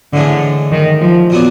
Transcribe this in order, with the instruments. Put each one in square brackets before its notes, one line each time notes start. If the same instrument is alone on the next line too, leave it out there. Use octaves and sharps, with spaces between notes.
[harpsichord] A2 E3 G#3 [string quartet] D3
[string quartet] D#3
F3
[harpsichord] A#2 F#3 B3 D4